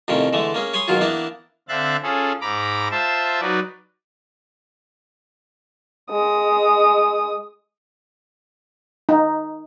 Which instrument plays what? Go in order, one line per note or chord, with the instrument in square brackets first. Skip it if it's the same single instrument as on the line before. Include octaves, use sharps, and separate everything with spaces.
[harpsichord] F2 A2 C3 D#3 C#4
D3 E3 G#3 A3
A#3 C#4 G#4
C#5 G#5 B5 C6 D#6
B2 D#3 F#3 F4 G#4
E3 A#3 B3 D4 E4
[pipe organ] D3 C4 E5 F5 F#6 A6
C#4 F4 G#4 A4
G#2 A#5 B5 D6
F4 C5 E5 A5
F#3 D#4 F#4 B4 D5
[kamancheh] G#3 D#6
[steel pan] D#4